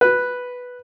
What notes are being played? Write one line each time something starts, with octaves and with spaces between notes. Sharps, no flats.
B4